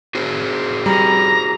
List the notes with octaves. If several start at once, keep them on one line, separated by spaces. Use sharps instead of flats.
F#4 G#4 C5
G3 A#5